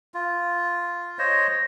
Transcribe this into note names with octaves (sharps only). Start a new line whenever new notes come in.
F4
C5 C#5 D#5